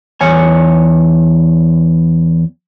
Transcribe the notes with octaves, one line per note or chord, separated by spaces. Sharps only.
E2 C#5 G#5